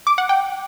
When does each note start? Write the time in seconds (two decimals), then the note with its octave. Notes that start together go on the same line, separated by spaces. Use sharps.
0.07 D6
0.18 F#5
0.29 G5